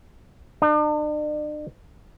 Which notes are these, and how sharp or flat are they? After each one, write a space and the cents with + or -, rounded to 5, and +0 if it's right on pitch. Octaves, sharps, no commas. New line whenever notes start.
D4 +45